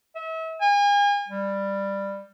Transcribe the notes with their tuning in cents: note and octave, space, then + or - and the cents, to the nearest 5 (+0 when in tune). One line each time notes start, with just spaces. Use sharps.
E5 -35
G#5 -35
G3 +10